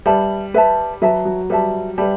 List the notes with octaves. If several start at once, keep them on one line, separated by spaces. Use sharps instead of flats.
G3 B4 E5 A5
B4 E5 A5
F#3 B4 E5 A5
F#3
G3 B4 E5 A5
G3 B4 E5 A5